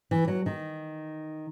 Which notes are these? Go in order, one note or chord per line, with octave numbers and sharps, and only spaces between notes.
E3
F#3
D#3